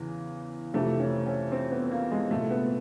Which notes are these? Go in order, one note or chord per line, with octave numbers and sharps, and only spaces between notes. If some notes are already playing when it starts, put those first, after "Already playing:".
Already playing: E2 C#3 E3
F2 C3 E3 A3
C#4
C#4
C4
B3
A#3
G#3
C2 A#2 A3
B3